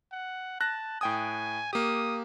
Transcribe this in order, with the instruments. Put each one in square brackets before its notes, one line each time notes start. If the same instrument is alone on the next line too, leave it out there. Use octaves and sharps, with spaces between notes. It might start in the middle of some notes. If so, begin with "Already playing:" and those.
[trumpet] F#5
[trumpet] A5 [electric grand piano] F#6 A#6
[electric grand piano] A2 G5 D#6 [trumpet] G#5
[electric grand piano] A#3 G4 [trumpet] D#6